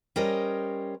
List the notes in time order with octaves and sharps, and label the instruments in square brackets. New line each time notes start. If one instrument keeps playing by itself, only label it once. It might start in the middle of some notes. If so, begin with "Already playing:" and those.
[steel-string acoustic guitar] G3 C#4 A#4 C5 C#5 D#5